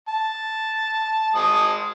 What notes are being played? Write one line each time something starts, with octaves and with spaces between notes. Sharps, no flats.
A5
G#3 A5 D#6